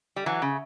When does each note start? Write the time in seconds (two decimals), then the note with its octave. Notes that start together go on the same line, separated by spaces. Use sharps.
0.16 G3
0.26 E3 F#3
0.42 C#3